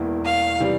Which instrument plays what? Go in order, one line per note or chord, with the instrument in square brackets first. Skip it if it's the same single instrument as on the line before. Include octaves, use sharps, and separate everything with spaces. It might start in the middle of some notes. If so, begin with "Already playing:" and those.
Already playing: [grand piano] E1 E2 E3 A#3 E4
[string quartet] F5
[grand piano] C3 E3 G3